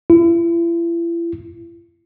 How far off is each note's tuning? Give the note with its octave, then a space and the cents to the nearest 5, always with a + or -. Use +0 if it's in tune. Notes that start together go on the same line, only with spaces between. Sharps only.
E4 +40